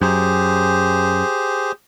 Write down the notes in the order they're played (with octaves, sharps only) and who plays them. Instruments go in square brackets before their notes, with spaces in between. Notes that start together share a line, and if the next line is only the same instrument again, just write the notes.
[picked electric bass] F#2 [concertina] G4 G#4 C5